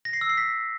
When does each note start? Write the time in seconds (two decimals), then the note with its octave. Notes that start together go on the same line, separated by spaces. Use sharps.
0.05 A#6
0.13 C7
0.21 E6
0.29 C7
0.37 B6